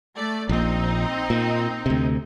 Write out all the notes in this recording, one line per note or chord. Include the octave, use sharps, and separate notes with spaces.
A3 D5
A#1 A#2 C4 D#4
A#2
D2 C3